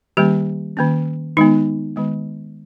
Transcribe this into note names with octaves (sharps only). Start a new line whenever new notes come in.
D#3 G3 A#3 C#4 G4
D#3 A#3 C#4
D#3 G#3 B3 D#4
D#3 G#3 B3